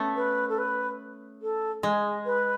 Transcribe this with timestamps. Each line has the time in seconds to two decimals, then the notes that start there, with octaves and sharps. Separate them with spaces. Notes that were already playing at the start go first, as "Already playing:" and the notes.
Already playing: A3 B3 C#4
0.16 B4
0.49 A4
0.58 B4
1.42 A4
1.83 G#3 G#4
2.25 B4